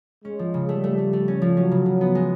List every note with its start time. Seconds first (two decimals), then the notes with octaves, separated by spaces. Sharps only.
0.25 G#3 C#4
0.39 F3
0.54 C#3
0.69 G3 A3
0.84 A3
0.98 A3
1.13 A3
1.28 C#4
1.42 F3
1.56 F#3 C#4
1.72 C#3
1.86 C#3
2.01 B3
2.15 G#3